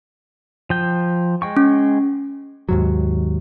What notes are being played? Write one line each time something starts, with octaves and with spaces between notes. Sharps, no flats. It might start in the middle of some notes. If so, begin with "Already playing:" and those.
F3 G5
G#3 G5 C#6
C#4
D#2 G#2 F#3